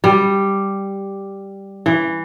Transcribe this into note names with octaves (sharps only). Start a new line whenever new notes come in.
G3
E3